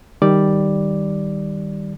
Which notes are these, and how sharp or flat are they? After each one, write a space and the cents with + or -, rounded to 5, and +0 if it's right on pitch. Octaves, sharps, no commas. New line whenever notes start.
D#3 +0 G3 +0 D5 +0